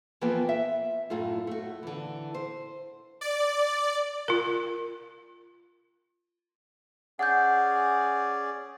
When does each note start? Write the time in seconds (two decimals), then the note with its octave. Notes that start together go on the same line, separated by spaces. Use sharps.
0.21 E3 F3 A#3 B3 B4 G5
0.49 E5
1.10 F#2 A2 A3 F4
1.47 A3 F#4
1.83 D3 E3
2.34 C5
3.21 D5
4.28 F4 A#4
7.19 C#4 G#4 D5 F#5 G6